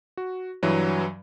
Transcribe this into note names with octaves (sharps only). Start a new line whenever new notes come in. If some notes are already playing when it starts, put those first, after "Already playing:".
F#4
G2 E3 F#3